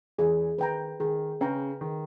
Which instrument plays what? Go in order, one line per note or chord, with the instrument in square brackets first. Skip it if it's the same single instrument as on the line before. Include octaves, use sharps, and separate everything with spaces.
[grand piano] E2 E3 [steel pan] G#4
[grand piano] D#3 [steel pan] B4 G5 A#5
[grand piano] D#3 [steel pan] G#4
[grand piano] C#3 [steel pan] B4 G5 A#5
[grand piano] D#3 [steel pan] G#4